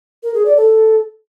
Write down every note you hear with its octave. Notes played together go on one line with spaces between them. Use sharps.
A#4
G#4
D5
A4